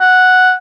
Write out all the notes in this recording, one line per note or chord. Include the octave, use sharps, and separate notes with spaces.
F#5